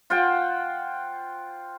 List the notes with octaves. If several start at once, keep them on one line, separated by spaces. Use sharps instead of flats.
F4 C5 F#5 G5